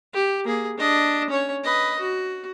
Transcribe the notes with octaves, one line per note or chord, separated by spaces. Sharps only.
G4
A#3 G#4
D4 D#5
C#4 C#5
B4 D#5
F#4